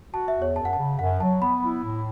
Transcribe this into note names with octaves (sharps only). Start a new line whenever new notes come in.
F#4 A5
E5
E2
C#5
F#2 A5
F#5
A5
C#3
F#2 F#5
F#3 A5
B3 B5
E4
A2